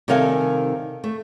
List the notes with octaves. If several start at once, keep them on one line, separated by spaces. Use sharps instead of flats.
C3 D#3 G3 A4 F5 G#5
A3